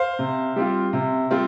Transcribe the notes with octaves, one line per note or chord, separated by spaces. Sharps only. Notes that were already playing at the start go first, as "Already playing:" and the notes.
Already playing: C5 F5
C3
G3 C4 F4
C3
G3 C4 F4